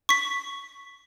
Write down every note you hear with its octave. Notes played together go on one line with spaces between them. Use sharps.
C#6 B6